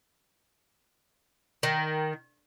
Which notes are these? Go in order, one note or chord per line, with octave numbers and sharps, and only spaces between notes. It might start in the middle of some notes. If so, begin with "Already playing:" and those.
D#3